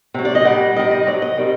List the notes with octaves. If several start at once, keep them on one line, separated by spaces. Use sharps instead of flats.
C3 F#3
D5
D#5
A#2 G3 F#5
C3 D#3 G3 D#5
D#5
C3 F#3 D5
D#5
C3 D#3 G3